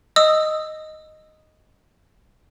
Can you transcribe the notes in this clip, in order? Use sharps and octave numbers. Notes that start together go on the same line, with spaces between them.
D#5 D#6 E6